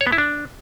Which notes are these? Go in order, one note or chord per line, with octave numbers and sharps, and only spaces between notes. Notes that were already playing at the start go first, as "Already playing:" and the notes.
C#5
B3
E4
D4